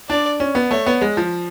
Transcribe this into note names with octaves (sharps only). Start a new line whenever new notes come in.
D4 D5
C#4
B3
A3 C#5
B3
G#3
F3